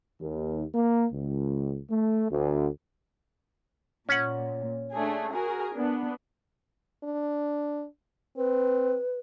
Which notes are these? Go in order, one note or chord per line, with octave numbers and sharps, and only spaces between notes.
D#2
A#3
C#2
A3
D2
A#2 C#4 F#5
A3 D4 G#4
F#4 G#4 A#4
B3 D4
D4
C4 B4